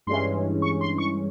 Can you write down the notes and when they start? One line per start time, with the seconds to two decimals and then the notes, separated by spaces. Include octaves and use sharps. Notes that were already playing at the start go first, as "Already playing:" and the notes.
0.07 G2 E3 G#3 C#4 C6
0.62 C#6
0.81 C6
0.98 C#6